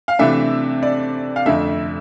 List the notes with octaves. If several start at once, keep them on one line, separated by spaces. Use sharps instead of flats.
F5
C3 E3 A3 D4 E5
D5
F5
F2 D3 A3 E5